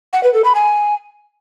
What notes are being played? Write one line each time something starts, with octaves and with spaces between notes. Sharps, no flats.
F#5
B4
A4
B5
G#5